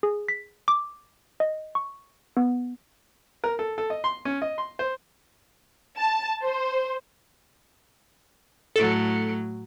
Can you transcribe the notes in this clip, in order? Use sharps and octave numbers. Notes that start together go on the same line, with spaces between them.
G#4
B6
D6
D#5
C#6
B3
A#4
A4
A4
D#5
C6
C#4
D#5
C6
C5
A5
C5
A2 F#3 A4